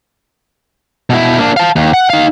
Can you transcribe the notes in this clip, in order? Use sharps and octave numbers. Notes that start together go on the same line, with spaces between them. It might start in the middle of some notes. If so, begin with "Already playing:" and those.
B2 E4
A#3 D4
F5 A5
D#2
F#5
D#4 F5